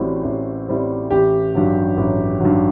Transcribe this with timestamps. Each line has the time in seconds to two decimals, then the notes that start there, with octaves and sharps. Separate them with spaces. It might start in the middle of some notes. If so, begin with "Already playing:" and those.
Already playing: A1 A2 G3 C4 F#4
0.24 A1
0.68 A2 G3 C4
1.10 A1 G4
1.55 G2 D#3 F#3
1.97 A1
2.40 G2 D#3 F#3